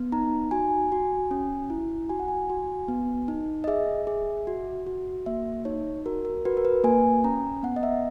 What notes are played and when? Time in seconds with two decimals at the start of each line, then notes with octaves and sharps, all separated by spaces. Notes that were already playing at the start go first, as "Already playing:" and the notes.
Already playing: B3
0.12 D#4 A#5
0.51 F#4 G#5
0.92 F#4
1.31 C#4
1.70 E4
2.09 F#4 G#5
2.19 F#5
2.28 G#5
2.50 F#4
2.88 B3
3.28 D#4
3.64 D#5
3.67 G#4 E5
4.07 G#4
4.47 F#4
4.86 F#4
5.26 A#3 E5
5.65 D#4 C#5
6.06 F#4 A#4
6.25 A#4
6.45 F#4 B4
6.57 A#4
6.65 B4
6.84 A#3 G#5
7.24 C#4 A#5
7.63 B3 F#5
7.76 D#5
7.83 E5